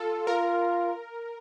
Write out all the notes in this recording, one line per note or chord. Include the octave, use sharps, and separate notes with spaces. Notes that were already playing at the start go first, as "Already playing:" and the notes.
Already playing: F4 A4
F4 A#4